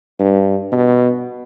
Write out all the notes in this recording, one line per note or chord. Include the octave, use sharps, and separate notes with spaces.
G2
B2